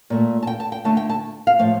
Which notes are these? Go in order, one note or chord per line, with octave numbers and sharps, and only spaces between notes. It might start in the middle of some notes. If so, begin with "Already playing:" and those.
A#2 A3
A5
G5
A5
G5
D3 A3 A5
G5
A5
F5
A2 F3 A3 F5